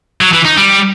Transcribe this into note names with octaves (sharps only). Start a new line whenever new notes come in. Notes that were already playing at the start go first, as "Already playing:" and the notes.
F#3
E3
D#4
G3